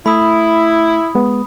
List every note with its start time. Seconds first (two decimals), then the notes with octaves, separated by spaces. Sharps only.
0.06 A3 E4 B5 D#6
1.15 G#3 B3